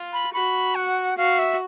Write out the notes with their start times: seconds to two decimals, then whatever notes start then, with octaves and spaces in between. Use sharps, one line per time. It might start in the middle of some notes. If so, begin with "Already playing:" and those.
Already playing: F4
0.13 B5
0.34 F#4 B5
0.75 F#5
1.17 F#4 F5
1.39 E5